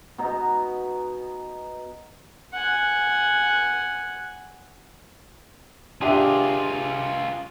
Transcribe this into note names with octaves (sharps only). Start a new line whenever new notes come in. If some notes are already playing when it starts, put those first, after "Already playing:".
B2 D#4 A#5
F#5 G#5
D4 F4 G4 G#4 E5